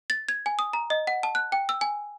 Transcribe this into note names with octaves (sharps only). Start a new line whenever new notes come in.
A6
G#6
G#5
D#6
A#5
D#5
F#5
A5
F#6
G5
E6
G#5